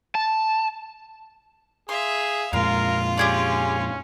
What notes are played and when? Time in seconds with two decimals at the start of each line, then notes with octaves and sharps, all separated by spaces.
0.15 A5
1.89 G#4 E5 F5 C6
2.53 F2 A#2 G#3 F4 A#4 F5
3.17 C#4 G4 G#4 D5